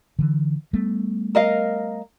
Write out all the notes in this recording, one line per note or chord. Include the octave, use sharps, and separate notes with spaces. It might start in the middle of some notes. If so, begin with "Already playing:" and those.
D3 E3
G3 A3 B3
A#4 D#5 F5